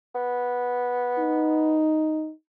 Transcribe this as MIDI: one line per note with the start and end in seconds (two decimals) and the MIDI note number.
0.15 1.83 59
1.19 2.32 63